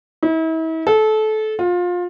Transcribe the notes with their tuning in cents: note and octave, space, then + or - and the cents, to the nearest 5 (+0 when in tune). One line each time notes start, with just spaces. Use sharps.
E4 -40
A4 -25
F4 +25